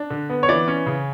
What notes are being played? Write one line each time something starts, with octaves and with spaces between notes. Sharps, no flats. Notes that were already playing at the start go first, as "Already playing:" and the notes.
Already playing: D4
D3
B3
C#5
E3 D5
C#4
C#3